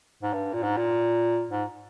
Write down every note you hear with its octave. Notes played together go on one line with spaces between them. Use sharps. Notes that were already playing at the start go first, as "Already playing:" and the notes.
G#2
G2
A#2
G#2
A#2
G#2